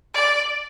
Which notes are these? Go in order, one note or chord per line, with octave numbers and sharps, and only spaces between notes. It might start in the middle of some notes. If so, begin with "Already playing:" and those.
D5